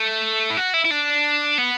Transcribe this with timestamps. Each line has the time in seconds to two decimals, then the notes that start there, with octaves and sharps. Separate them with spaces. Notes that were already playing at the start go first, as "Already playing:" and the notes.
Already playing: A3
0.50 E4
0.57 F#4
0.74 E4
0.85 E4
0.91 D4
1.58 B3